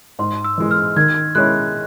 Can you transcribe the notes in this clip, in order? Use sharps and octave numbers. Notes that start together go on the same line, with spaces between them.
G#2 C6
E6
E3 G#3
F6
D#3 G#6
G#3 C#4 E4 F#6